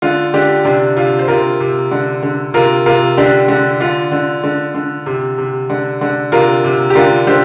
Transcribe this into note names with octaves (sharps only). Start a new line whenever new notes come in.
D3 F4
D3 D4 G4
C3 D4
C3 F4
C5
C3 F4 A#4
C3
D3
D3
C3 F4 A#4
C3 F4 A#4
D3 D4 G4
D3
D3 F4
D3
D3
D3
C3
C3
D3
D3
C3 F4 A#4
C3
G4
D3 F4 A#4
D3 G4 C5